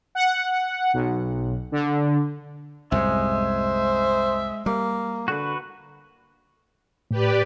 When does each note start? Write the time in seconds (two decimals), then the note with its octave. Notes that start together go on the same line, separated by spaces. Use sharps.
0.15 F#5
0.93 B1
1.72 D3
2.92 C2 F#2 A2 G#3 C5 E5
4.66 G3 A#3
5.28 D3 F#4 B4
7.11 A2 G4 B4 D5